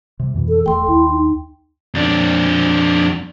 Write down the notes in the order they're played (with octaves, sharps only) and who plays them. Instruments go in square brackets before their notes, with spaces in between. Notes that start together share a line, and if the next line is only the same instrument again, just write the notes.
[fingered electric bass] C3 G3
F2 B2 E3
[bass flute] A4
[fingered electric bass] E1 A3 [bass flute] A4 [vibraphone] G5 C6
[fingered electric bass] D#2 [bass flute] E4
[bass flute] D#4
[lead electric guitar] F2 D4